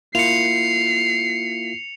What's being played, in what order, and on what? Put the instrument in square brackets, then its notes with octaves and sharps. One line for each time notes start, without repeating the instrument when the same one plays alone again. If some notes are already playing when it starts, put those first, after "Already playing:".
[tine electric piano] A#3 E4 F4 [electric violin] C7 [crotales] C#7 F7